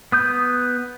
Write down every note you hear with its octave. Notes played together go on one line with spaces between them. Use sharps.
B3 D#6 G6